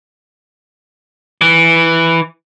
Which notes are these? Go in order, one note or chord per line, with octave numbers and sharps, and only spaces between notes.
E3